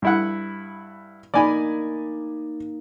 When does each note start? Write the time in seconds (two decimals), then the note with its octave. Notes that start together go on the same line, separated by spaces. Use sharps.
0.02 G2 E4 F#5
1.34 A#3 D#4 D5 G#5 B5